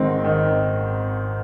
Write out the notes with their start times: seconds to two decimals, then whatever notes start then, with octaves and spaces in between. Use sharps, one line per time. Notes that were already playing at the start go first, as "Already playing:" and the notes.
Already playing: G#1 G#2 D#3 C4 D#4
0.24 D#3 D#4